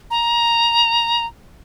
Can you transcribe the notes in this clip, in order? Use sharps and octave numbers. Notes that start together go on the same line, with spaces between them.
A#5